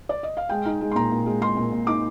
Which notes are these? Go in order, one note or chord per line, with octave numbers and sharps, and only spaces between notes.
D5
D#5
F5
G#3 G5
D#4
G#3
C6
A#2 A#5
A#2
G#3
G#3 C6
A#2
A#2
D#4 D6